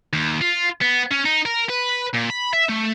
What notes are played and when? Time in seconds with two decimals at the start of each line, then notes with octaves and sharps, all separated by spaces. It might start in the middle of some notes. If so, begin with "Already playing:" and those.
0.13 D#2
0.41 F4
0.81 B3
1.11 C#4
1.25 D#4
1.45 A#4
1.70 B4
2.14 A#2
2.30 B5
2.53 E5
2.69 A3